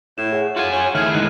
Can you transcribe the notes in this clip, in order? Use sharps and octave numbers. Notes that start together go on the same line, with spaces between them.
A2 E4 E7
G#4 C#5 F#5
F4 F#4 G#5
C#4
D#3 A3 E4 G#4 F6
D#3 G#3 D#4 E4 F#6 D#7